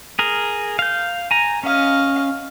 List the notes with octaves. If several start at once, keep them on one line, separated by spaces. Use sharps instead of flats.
G#4 A#4
F5 G6
G#5 A#5
C#4 D#5 F5